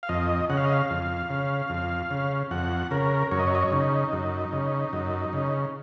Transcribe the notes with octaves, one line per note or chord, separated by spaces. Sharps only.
F5
F2 D#5
C#3 F#5
F5
D#5
F5
F2
C#3
F2
C#3
F2 F#5
C#3 A#4
F#2 C#5
D#5
C#5
D#5
C#5
C#3 D#4
F#2
C#3
F#2
C#3